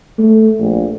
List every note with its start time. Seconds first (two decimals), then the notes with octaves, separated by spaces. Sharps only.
0.19 A3
0.60 A#1